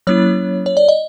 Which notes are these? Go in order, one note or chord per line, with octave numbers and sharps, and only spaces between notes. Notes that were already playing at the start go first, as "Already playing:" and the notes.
F#3 A#3 C#4 E4 C#5
C#5
D5
D#5